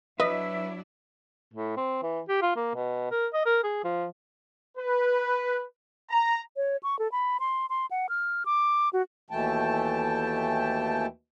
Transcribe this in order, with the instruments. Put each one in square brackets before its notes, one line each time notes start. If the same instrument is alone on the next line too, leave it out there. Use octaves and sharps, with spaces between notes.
[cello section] F#3 D4 E4 [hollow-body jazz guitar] B4 [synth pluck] D#5 [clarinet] E5
[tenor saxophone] A2
C4
E3
G4
F4
A#3
B2
A#4
D#5
A#4
G#4
F3
[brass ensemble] B4
A#5
[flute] C#5
C#6
A4
B5
C6
C6
F#5
F6
D6
F#4
[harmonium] D#2 B2 E3 A3 G5 A5